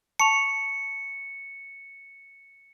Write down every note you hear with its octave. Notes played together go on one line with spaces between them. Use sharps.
A5 C#6 C#7 F7